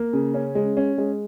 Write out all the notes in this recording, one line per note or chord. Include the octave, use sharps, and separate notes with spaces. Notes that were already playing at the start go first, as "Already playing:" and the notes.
Already playing: A#3
C#3
C#4
G#3
C#4
G#3